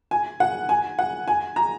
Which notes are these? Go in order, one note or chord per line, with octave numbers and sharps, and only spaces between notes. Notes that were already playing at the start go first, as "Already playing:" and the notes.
G#5
F#5
G#5
F#5
G#5
A#5